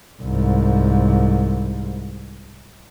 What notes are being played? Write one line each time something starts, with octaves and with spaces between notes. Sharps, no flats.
C2 G#2